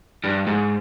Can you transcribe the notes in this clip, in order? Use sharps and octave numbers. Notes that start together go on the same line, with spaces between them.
G2
G#2